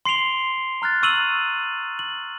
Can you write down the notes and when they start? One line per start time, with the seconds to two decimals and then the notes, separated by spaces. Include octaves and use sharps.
0.05 C6 C7 D7 F7 G7
0.82 A#5 F6 F#6 A6
1.03 C#6 E6 D#7 F7 F#7
1.99 F#7